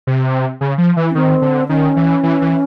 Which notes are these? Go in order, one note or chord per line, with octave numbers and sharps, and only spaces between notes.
C3
C#3
F3
E3
C#4
D#3 C4
D3
D#3 C#4
E3
E3
E3